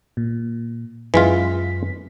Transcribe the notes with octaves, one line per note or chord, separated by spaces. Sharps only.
A#2
F#2 E3 G#3 F4 B6